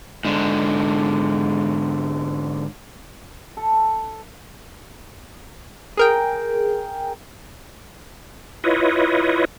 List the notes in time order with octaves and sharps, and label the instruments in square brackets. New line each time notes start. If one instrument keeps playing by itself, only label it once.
[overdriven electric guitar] G#2 D3
[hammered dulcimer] A4
[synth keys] G#4 A#4 G5
[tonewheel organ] E4 F4 B4 C#5 D#5